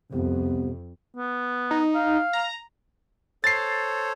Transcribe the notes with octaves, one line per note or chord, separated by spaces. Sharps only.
C2 F2 C3 B3
B3
D#4
F5
A#5
A4 C5 C#5 A6 C7